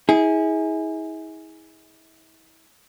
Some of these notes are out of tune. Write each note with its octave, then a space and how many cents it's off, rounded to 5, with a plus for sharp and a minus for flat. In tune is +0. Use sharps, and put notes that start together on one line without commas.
E4 -40 G#4 +0